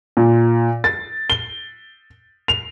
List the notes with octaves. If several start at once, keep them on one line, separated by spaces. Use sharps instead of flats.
A#2
A6
G7
F7